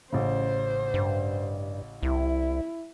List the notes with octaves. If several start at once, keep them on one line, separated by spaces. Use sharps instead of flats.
A1 C#3 C5
G2
C2 E4